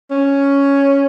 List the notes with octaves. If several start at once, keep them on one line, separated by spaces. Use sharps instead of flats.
C#4